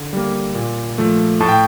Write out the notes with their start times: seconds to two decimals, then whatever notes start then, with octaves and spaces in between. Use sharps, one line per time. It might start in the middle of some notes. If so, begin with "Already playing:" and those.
Already playing: D3
0.13 G3 A#3
0.55 A#2
0.98 F3 A3
1.41 A2 A5
1.48 G5